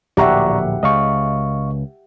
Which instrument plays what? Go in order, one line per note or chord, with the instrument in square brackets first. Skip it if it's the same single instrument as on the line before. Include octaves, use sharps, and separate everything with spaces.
[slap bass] D1 A#1 [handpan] G4 E5 F#5 [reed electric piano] D5 A#5 C#6
[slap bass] C#2 [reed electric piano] D#5 F5 C#6